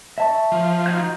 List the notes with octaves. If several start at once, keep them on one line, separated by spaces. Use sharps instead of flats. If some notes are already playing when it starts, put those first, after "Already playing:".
E5 A5 C#6
F3
D#4 F#4 G6